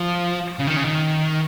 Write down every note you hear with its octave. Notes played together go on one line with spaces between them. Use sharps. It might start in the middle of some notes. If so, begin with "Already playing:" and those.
Already playing: F3
C#3
D#3
C#3
D#3